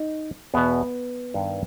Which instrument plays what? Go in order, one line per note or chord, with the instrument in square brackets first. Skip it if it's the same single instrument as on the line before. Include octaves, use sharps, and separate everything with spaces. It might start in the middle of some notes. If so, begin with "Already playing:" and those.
Already playing: [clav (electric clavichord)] D#4
E2 B2 B3
G2 D#3